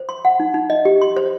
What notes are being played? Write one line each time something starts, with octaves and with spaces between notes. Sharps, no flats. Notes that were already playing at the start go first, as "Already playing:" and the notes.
Already playing: C5
C6
F#5
D#4
D#4
D#5
G4
C6
C5